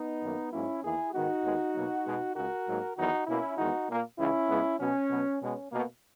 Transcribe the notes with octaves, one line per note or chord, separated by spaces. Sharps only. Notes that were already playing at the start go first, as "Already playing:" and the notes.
Already playing: B3 D#4
F#2 D#3 A#3
G#2 F#3 A#3 C#4 E4
E2 D#3 A#3 E4 G#4
G#2 D#3 G#3 B3 D#4 F#4
D#2 D#3 G#3 B3
B2 F#3 A#3
B2 G#3 B3
C#2 C#3 G#3 F#4 A#4
G#2 F#3 A#3
E2 D#3 F#3 B3 D#4 F#4
B2 A#3 C#4 E4
E2 D#3 G#3 B3 D#4 F#4
A#2 A#3
C#2 C#3 E3 C#4 E4
C#2 C#3 G#3 B3
B2 F#3 B3 C#4
B2 F#3 B3
B2 G#3 B3 C#4
B2 A#3